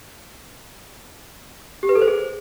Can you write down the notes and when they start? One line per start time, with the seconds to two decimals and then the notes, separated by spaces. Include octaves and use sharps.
1.83 G4
1.89 B4
1.95 A4
2.02 C5
2.08 G#4